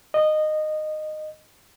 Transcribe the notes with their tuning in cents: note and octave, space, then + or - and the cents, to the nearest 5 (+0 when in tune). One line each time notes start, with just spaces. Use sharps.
D#5 -15